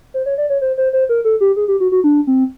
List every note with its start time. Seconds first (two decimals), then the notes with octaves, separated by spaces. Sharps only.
0.14 C5
0.26 C#5
0.38 D5
0.50 C#5
0.61 C5
0.78 C5
0.93 C5
1.09 A#4
1.25 A4
1.41 G4
1.56 G#4
1.68 G4
1.80 F#4
1.92 F#4
2.04 D4
2.27 C4